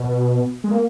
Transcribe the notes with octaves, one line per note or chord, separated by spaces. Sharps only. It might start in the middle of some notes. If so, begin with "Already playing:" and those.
Already playing: B2
G#3
A#3